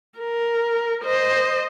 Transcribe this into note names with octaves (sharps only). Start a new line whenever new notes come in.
A#4
C5 D#5